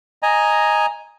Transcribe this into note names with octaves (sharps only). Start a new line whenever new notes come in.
D#5 G#5 A#5